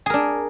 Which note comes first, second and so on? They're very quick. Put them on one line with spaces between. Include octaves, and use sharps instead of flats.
G#4 A#4 D4